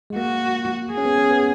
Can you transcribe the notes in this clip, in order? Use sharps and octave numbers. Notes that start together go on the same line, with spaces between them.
G#3
A#3 F#4
G#4
C#4
B3
C#4
B3